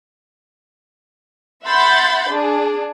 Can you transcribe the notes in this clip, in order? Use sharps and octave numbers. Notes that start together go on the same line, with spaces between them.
E5 F#5 B5 C6 G6 A6
D4 G#4